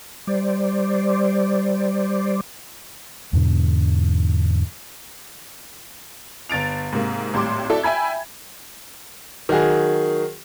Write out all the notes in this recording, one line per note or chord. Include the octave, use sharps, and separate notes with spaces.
G3 C5 D5
E2 G#2 B2 D3
G1 A6 D7 F7
G#2 C3 A#3
G#1 A2 G3 C6 D6
E4 F#4 A4 D5
E5 G5 G#5 B5 G#6
D#3 F#3 F#4 G#4